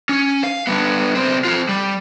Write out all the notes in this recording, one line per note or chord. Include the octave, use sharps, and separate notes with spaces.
C#4
F5
G3 B3
B1 C4
C4 F4
G3